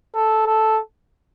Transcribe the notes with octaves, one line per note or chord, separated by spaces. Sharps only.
A4
A4